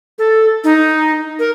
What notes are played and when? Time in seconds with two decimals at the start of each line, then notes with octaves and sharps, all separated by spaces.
0.19 A4
0.64 D#4
1.39 A#4